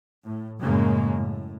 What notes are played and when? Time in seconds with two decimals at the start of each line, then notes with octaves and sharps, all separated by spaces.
0.23 A2
0.61 F#2 A2 C#3 G#3 A#3
1.13 A2